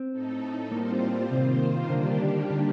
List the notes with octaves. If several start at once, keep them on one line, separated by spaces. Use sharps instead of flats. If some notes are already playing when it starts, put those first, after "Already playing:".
Already playing: C4
A2 A3 D#4 A4
A2 G3 A#3 C4 F4 C5
C3 D#3 A#3 F4 C5
D3 D#3 G3 A#3 D4 G4
D3